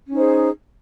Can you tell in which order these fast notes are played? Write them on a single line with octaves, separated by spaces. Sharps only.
C#4 D#4 C5 G#4